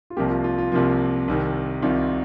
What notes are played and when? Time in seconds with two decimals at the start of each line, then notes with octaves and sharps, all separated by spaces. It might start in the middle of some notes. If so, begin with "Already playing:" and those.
0.10 F4
0.17 C2 C3 F3 A#3 G4
0.30 F4
0.44 F4
0.58 F4
0.72 C2 C3 F3 A#3
1.28 C2 C3 D#3
1.82 C2 C3 D#3 F4